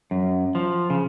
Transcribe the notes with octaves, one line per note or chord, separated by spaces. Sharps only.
F#2
F3
C#3